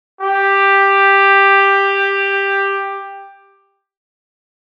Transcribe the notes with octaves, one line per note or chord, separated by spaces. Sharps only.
G4